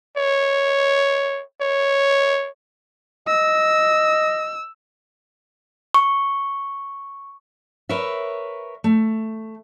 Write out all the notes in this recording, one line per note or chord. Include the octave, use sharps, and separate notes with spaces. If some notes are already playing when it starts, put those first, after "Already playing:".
C#5
C#5
D#5 E6
C#6
A#4 B4 C#5 E5
A3